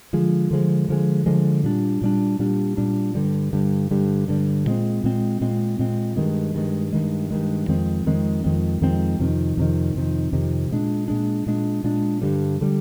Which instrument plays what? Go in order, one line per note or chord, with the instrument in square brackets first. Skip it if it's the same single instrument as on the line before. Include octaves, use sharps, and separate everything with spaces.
[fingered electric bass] D3 F3 G#3
D3 F3 G#3
D3 F3 G#3
D3 F3 G#3
A#2 G3 D4
A#2 G3 D4
A#2 G3 D4
A#2 G3 D4
G2 D3 G3
G2 D3 G3
G2 D3 G3
G2 D3 G3
A#2 G#3 C4
A#2 G#3 C4
A#2 G#3 C4
A#2 G#3 C4
G2 D#3 G#3
G2 D#3 G#3
G2 D#3 G#3
G2 D#3 G#3
F2 D#3 G#3 C4
F2 D#3 G#3 C4
F2 D#3 G#3 C4
F2 D#3 G#3 C4
F2 C3 D#3
F2 C3 D#3
F2 C3 D#3
F2 C3 D#3
A#2 G#3 D4
A#2 G#3 D4
A#2 G#3 D4
A#2 G#3 D4
G2 D3 G3
D3 G3